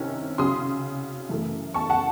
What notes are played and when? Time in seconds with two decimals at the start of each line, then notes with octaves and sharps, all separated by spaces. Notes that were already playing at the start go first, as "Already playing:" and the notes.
Already playing: C2 C3 D#3 C#4
0.38 C#3 F#3 C#4 C6 D#6
1.29 F#2 E3 A3
1.74 A5 C#6
1.90 F#5 A5